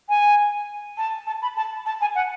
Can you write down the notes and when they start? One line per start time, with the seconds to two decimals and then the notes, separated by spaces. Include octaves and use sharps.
0.08 G#5
0.97 A5
1.26 A5
1.41 B5
1.56 A5
1.85 A5
2.00 G#5
2.14 F#5